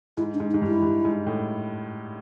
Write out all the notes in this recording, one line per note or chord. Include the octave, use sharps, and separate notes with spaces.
G#2 E4
D4
G#2
D#4
G#2
G2
E4
G2
G#2
A2